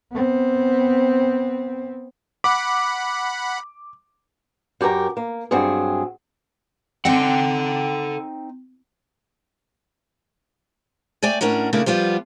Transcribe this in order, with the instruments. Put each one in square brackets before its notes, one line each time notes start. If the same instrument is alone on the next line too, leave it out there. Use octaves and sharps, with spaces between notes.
[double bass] B3 C4
[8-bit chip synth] F#5 B5 [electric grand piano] D6
[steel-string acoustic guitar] F#2 G4 A4 A#4 A#5
A#3
G2 F#3 C4 G#4
[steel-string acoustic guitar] C4 D#4 G5 [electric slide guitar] A4 F#5
[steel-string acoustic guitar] A3 D5 G5 G#5
A2 C#4 D4 A#4 F#5
C#3 A3 A#3 D4 E4
F3 G3 B3 F4